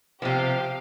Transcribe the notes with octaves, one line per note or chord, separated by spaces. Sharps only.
C3 F3 G4 F5 G5